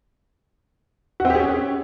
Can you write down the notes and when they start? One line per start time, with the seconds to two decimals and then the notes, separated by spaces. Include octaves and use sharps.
1.20 F#4
1.25 C4
1.30 G4
1.35 G#4
1.40 C#4